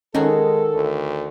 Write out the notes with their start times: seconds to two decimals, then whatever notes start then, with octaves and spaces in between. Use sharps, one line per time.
0.14 D#3 G#3 C#4 D#4 F#4 G#4 A4
0.75 D2